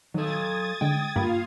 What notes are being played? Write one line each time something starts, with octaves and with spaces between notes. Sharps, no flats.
D#3 F#3 A4 D#6 G#6 A6
D3 G#3 G5
G2 A#3 F4 F5 B5